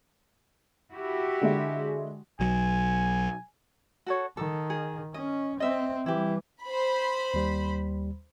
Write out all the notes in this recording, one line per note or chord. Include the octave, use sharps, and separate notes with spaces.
E4 F#4 G4
D3 G#3 E5
B1 F#3 G#5
F#4 A4 C#5
D#3 A4
G#4
C#4 D#5
C4 D#5 E5
E3 G3 E4 G4
C5 B5
D#2 G3